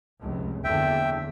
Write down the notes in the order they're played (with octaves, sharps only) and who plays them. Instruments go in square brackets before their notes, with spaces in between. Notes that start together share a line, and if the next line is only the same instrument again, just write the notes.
[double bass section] F1 C#2
[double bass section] F#1 E2 D3 [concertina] E5 G5